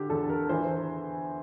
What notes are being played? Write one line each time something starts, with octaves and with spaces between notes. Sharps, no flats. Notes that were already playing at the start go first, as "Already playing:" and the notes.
Already playing: D3 G4
E2 A4
A#4
E3 C5